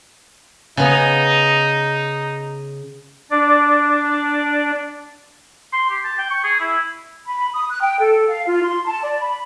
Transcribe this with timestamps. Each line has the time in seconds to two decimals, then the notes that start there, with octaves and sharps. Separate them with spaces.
0.77 C#3 B3 D#4
3.31 D4 D5
5.73 C6
5.90 G4
6.05 A5
6.18 G5
6.31 C#6
6.44 G#4
6.60 E4
7.26 B5
7.54 D#6
7.70 F#6
7.82 G5
8.00 A4
8.28 F5
8.46 F4
8.64 C6
8.86 A5
9.02 D5
9.19 B5